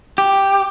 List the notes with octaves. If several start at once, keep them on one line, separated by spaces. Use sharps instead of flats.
G4